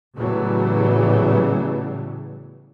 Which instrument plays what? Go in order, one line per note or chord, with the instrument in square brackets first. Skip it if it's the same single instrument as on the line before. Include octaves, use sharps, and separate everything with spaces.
[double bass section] A2 C#3 E3 F#3 G3 B3